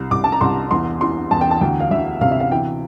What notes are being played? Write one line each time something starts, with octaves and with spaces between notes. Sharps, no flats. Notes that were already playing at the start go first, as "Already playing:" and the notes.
Already playing: C2
C2 D6
A5
A#5
C2 C6
E2 C6
E3 C6
E2 A5
G5
A5
D2 G5
F5
D2 E5
C3 F5
E5
F5
E3 G5